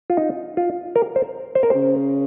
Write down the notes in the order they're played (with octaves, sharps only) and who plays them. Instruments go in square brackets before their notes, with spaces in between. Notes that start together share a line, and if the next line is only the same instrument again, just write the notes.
[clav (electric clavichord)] F4
D#4
F4
A#4
C5
C5
A#4
[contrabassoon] C#3 [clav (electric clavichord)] C5